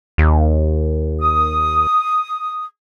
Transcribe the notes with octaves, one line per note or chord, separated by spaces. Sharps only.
D#2
D#6